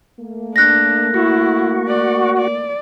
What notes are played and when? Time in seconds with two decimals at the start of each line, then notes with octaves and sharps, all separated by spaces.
0.20 A3 A#3
0.56 D4 F#6 A#6
1.14 E4 F#4
1.88 D5
2.38 D5